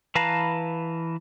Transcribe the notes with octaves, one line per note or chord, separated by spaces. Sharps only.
E3 B4 F5 A5 A#5